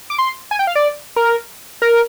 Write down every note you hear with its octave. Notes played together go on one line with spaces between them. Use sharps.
D6
C6
G#5
G5
F5
D5
A#4
A#4